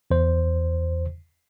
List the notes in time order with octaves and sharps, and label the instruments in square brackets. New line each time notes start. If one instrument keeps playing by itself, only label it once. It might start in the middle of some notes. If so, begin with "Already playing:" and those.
[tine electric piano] E2 C5